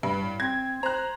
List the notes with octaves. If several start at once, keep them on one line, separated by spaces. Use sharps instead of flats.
G2 B4
A2
C4 G#6
C5 A#5 F#6